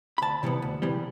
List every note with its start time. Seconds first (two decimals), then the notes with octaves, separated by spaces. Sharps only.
0.18 B5
0.22 D2 A5
0.43 C3 E3 G3 B3
0.62 D2
0.82 C3 E3 G3 B3